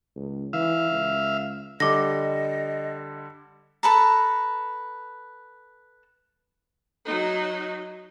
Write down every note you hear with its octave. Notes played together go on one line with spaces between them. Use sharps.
C#2
E3 E5 F5
C#2
D3 G3 D#5 D6 A#6
A4 B4 A#5
F#3 D#4